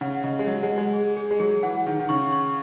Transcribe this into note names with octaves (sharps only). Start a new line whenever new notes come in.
C#3 F#5
C#3 D#5
G#3
F#3 F#5
G#3
F#5
G#3
G#4
G#4
G#3
F#3 G#4
E3 F#5
D#3 F#5
D#3
C#3 C#6
C#6